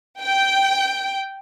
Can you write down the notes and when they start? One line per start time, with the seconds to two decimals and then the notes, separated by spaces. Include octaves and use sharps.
0.22 G5